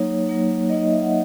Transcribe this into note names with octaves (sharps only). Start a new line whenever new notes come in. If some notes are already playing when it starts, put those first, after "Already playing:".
Already playing: F#3 A#3 D#4 C#5
F#3 A#3 D#4
F#3 A#3 D#4 D#5
D#5
E5
F#5